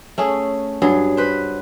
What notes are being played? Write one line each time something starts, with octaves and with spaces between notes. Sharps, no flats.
A3 C#4 G#4
G2 F#3 G#4
B4 C5